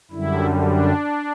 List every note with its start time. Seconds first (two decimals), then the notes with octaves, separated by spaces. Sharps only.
0.11 F#2 D3 G3 E4
0.62 D4